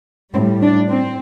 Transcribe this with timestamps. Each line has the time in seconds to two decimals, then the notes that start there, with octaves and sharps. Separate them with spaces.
0.34 G3 C4
0.38 A2
0.61 D4
0.91 C4